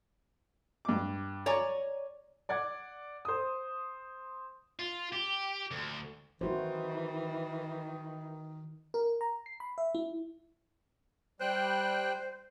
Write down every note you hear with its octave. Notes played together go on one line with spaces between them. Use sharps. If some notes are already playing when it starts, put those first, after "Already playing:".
G2 D6
C#5 D5 G#5 A#5 C#6
D5 F#5 G#6
C5 D#6
F4
G4
D2
D#3 E3 E4 F#4 C5
A#4
A#5
C7
B5
E5
E4
G3 C5 G5 F#6